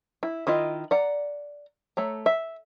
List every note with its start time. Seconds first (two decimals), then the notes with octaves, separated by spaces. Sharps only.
0.23 E4
0.47 D#3 E4 F4 D#5
0.91 D5 F#5 A#5
1.97 A3 C#5 A#5
2.26 E5